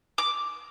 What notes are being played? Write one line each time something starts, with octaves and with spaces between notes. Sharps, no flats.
D6